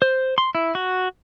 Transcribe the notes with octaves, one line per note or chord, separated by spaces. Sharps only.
C5
C6
E4
F#4